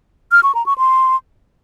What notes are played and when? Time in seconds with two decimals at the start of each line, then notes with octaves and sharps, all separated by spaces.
0.32 F6
0.43 C#6
0.55 A#5
0.66 C#6
0.78 C6